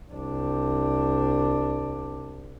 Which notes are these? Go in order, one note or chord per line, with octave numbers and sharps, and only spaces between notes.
C2 D4